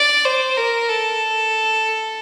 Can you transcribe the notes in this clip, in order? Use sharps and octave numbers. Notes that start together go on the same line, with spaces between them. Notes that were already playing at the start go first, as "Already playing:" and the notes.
Already playing: D5
C5
A#4
A4